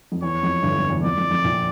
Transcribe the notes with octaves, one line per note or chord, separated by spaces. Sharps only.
F2
E2 C#5
F2
G1 G2
F2
E2
F2 D5
F2
F2
A#1 A#2